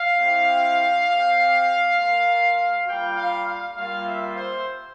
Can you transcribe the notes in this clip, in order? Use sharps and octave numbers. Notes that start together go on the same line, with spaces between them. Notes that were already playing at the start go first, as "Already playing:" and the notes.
Already playing: F5
C4 E4 G4
C4 G4
A#3 F4
G3 A#3 F4 G5
F5
F5
G3 A#3 F4 F5
E5
C5